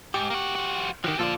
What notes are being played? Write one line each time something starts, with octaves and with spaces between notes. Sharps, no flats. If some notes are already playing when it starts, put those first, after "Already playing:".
G#2 G4
A#3 F#4
F3 F#4
D#3 F3 F#4 G4
A#2 F3 F4 A4 D5